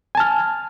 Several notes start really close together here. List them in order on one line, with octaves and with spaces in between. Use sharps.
G#5 A5 F6